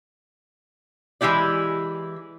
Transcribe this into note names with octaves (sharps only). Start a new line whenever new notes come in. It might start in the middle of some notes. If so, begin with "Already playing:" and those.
E3 G#3 E4 G4 D5